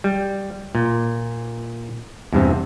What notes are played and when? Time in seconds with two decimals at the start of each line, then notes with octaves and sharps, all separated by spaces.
0.04 G3
0.75 A#2
2.33 E2 G2 C3